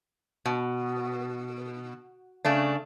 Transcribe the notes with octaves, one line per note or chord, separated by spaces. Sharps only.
B2
C#3 A3 D4